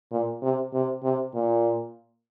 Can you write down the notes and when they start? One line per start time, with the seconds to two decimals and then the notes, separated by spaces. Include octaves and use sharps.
0.11 A#2
0.42 C3
0.73 C3
1.03 C3
1.34 A#2